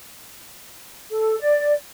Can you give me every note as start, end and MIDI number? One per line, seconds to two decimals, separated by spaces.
1.10 1.36 69
1.38 1.73 74